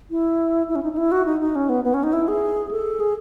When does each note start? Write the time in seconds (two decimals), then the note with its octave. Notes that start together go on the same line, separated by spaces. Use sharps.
0.11 E4
0.68 E4
0.75 C#4
0.83 D#4
0.93 D#4
0.98 E4
1.12 F#4
1.26 D#4
1.40 D#4
1.56 C#4
1.69 B3
1.84 B3
1.94 C#4
2.03 D#4
2.13 E4
2.28 G#4
2.71 A4
3.00 G#4